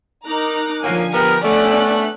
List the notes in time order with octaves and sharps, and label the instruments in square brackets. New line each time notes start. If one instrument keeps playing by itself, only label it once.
[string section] D#4 A#5 D6 [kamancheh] A#4 F#6
[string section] D3 F3 G#5 [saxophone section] F#3 A#3
[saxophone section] B3 [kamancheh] G4 [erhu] A#4
[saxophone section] A3 [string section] B3 D4 F#6 [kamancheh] C#4 F#5 [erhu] D5